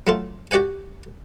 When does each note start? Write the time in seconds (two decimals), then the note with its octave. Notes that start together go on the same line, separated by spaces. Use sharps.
0.07 F#3 A3 F4
0.51 F#4 G4 D5 F#5 G#5